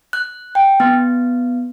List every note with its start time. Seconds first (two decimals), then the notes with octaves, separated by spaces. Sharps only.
0.13 F#6
0.55 G5
0.80 B3